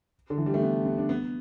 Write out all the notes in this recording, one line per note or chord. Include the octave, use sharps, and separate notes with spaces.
D3
E3
G3
A3
B3
B3
D4
B3